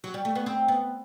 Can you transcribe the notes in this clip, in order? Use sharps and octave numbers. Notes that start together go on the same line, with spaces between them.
F#3
G3
A3
B3
C4
B3